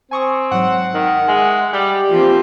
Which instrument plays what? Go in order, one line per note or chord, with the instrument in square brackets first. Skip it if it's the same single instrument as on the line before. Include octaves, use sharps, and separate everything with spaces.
[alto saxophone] C4 [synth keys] G#5 C#6 D#6
[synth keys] G#2 F#3 [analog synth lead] F#5
[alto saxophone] D#3
[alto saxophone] G#3 [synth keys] E5 G#5
[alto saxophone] G3 [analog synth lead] G4
[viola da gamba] F3 C4 [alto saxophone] A#3